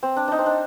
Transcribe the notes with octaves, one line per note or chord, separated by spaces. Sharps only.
C4
D4
D4 D#4
C4
D4